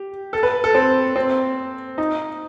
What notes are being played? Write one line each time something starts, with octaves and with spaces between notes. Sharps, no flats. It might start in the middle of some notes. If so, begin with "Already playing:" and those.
Already playing: G4
A4
B4
A4
C4
C4
D#4